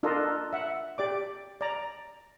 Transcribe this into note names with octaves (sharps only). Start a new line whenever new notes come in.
D4 F4 A4 A#4 D#5
E5 F#5
G4 D5 D6
D5 A#5